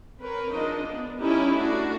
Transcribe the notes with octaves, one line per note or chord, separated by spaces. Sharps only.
C4 A#4 B4 C#5
F3 G#3 D4 D#4 A#4 D#5
B3 D4
G3 C#4 D#4 E4 G4 A4
A3 C#4 D4 F#4